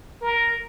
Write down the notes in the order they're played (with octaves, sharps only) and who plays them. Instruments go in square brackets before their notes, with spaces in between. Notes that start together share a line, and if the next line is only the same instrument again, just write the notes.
[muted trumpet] A#4